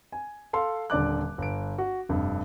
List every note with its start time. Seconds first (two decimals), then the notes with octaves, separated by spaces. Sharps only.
0.12 G#5
0.53 A4 F5 C6
0.90 D#1 D3 D5 D6 F#6
1.38 G1 D7
1.78 F#4
2.09 F1 G2